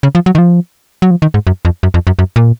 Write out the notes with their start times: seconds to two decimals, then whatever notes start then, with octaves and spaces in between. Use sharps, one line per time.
0.03 C#3
0.15 F3
0.26 F#3
0.35 D#3
0.38 F3
1.02 F#3
1.11 F3
1.22 D#3
1.34 G#2
1.47 F#2
1.65 F2
1.83 F#2
1.94 F2
2.07 F#2
2.19 F#2
2.36 A#2